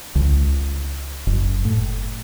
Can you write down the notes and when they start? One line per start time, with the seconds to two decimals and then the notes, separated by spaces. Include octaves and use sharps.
0.15 C#2
1.27 F#1
1.65 A2